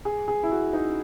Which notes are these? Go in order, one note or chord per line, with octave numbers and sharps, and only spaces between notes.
G#4
G#4
E4
F#4
D#4